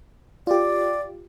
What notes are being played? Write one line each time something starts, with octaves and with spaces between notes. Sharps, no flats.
F4 G4 D5